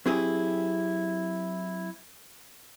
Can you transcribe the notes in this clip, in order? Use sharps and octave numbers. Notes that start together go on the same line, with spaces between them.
F#3 C4 E4 G4 G#4